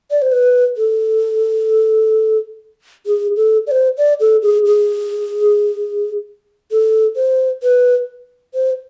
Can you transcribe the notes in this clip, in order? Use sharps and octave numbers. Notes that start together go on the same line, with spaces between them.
D5
C5
B4
A4
G#4
A4
D5
C5
D5
A4
G#4
G#4
A4
C5
B4
C5